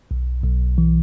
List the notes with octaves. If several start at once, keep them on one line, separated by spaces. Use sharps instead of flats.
B1
B1
E3